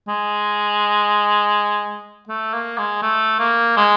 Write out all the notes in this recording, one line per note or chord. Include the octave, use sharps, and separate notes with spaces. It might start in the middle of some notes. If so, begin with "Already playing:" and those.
G#3
A3
A#3
G#3
A3
A#3
G#3